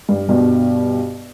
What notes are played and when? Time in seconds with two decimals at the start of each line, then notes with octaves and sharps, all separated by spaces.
0.09 G2
0.29 G2 B2